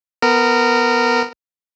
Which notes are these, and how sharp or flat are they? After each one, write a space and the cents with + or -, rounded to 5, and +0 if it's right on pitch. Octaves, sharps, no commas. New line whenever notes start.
B3 +0 A#4 -15